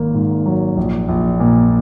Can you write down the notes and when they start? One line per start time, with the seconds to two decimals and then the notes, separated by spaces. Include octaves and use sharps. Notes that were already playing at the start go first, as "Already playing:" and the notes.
Already playing: G#1 A#3
0.14 G#2
0.46 F#3
0.77 A#1
1.09 A#1
1.40 A#2